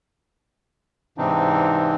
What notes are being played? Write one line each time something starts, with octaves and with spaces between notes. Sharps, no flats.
G#2 C3 E3 C4 D4 D#4